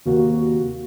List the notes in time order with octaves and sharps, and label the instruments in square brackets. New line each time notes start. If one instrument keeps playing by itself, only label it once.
[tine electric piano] D#2 C3 A#3 [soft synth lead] F#4